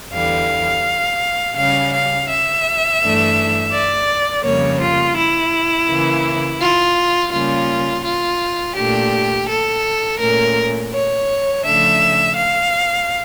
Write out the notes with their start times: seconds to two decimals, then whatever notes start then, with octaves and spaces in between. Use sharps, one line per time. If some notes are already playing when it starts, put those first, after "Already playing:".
0.12 E2 D3 G3 F5
1.56 C#3 G3 C#4 F5
1.92 F5
2.28 E5
3.00 G2 E3 A3 D4
3.72 D5
4.44 F2 C#3 G3 A#3 C#5
4.80 F4
5.16 E4
5.88 C#3 E3 A#3
6.60 F4
7.32 C#3 G3 A#3 C#4 F4
8.04 F4
8.76 A#2 A3 D4 G4
9.48 A4
10.20 A#2 A3 C#4 A#4
10.92 C#5
11.64 C#3 F3 A3 D4 E5
12.35 F5